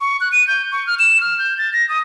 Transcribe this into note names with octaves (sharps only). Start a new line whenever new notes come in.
C#6
F#6
D#7
G6
C#6
F6
E7
F6
G6
A6
A#6
D#6